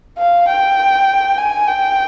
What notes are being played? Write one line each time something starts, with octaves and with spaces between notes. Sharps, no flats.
F5
G5
G#5
G5